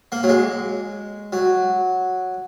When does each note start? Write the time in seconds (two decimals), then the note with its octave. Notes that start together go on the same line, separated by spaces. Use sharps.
0.12 A#3
0.23 F#3
0.29 G#3
1.33 F#3